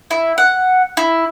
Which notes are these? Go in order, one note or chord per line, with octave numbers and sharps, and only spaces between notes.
E4
F#5
E4